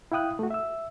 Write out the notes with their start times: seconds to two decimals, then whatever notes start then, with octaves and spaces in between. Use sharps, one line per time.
0.12 E4 F5 G5 D#6 F#6
0.39 A3 F#4
0.51 E5 E6